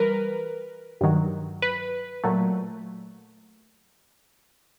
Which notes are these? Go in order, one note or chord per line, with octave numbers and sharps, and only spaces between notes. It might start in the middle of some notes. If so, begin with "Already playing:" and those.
Already playing: E3 G3 A#4 B4
G2 D#3 F#3
B4
A#2 F#3 A3